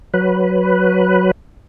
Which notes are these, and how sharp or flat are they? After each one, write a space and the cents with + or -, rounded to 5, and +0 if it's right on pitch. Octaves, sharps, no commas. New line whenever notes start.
F#3 +0 B4 +0